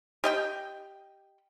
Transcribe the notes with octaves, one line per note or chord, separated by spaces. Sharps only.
G4 D#5 G5